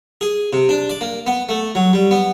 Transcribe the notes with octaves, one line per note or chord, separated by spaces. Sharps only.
G#4
C3
D4
D5
A#3
B3
A3
F#3
G3
B3